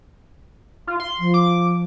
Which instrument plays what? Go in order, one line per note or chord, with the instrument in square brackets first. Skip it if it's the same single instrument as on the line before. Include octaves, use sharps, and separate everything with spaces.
[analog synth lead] F4
C6
[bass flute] F3
[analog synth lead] D6